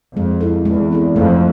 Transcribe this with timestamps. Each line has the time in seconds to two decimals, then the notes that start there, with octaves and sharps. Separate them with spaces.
0.16 F2 G#3
0.41 C4 E4 A4
0.65 E2 G#3
0.91 C4 E4 A4
1.15 F2 A3